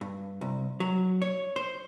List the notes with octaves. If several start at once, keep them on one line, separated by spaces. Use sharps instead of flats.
G2
C2
F#3
C#5
C5